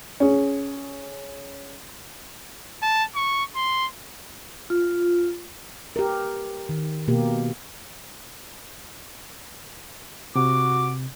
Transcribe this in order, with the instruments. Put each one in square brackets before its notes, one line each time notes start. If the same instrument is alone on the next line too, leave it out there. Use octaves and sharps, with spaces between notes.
[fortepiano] C#4 G#4
[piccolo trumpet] A5
C#6
C6
[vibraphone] F4
[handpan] G4 A#4
D#3
B2 A#3 G4
[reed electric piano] C3 [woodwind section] F#4 D6